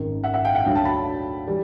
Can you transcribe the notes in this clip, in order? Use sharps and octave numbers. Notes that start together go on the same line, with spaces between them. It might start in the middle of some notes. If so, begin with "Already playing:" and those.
Already playing: G#1 F#2 D#3
E5 F#5
E5 F#5
F5 G5
E5 F#5
D2 D3 F#3 F5 G5
G5 A5
A5 B5
E3 G3